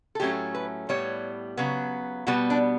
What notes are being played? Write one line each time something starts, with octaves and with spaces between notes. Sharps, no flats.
A4
A2 F#3 A3 C#4 G4
B4
A2 G3 B3 C#5
C#3 F#3 B3
B2 G3 B3 F#4
D4